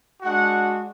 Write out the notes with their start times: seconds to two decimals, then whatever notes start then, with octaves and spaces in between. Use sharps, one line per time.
0.21 G#3 D4 F#4 F#5